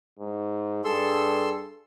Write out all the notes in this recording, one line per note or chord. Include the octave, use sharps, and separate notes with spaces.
G#2
G2 G#4 A4 C6 E6